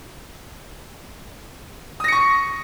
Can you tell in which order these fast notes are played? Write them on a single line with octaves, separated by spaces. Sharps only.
D#6 A#6 C#7 C#6